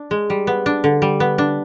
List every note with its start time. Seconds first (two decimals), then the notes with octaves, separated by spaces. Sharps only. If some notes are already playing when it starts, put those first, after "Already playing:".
Already playing: D4
0.11 G#3
0.30 G3
0.47 B3
0.66 D4
0.84 D3
1.02 G3
1.20 B3
1.38 D4